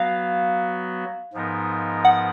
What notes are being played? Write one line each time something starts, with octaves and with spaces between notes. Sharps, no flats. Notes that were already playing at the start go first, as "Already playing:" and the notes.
Already playing: F#3 B3 F#4 F5
G#2 F3 B3 D#4 A#4
F#5